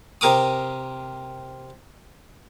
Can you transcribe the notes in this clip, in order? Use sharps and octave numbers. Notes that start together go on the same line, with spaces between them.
C3 A#4 D6 D#6